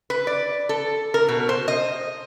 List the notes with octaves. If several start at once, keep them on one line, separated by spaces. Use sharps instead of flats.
B4
D5
A4
A#4
B2
C5
D#5